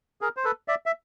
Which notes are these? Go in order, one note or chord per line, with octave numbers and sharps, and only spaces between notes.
G#4 A#4
C5
A4 B4
D5 E5
E5